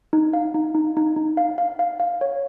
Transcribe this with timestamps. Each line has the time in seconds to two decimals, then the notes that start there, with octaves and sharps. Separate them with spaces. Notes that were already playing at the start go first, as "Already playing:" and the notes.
0.13 D#4
0.33 F5
0.54 D#4
0.75 D#4
0.97 D#4
1.16 D#4
1.37 F5
1.58 F5
1.79 F5
2.00 F5
2.21 C#5